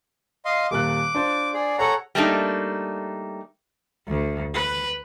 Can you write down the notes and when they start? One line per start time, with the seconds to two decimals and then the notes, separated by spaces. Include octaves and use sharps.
0.45 D#5 F5 C6
0.71 D#1 A#2 D6 F#6
1.15 D4 F4 C5
1.54 G#4 D5
1.79 G#4 A4 C#5 F#5 A#5
2.15 G3 A3 A#3 D4 D#4
4.08 D2
4.54 B4